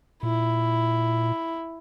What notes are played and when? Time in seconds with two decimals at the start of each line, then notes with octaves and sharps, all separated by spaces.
0.23 A#2 E4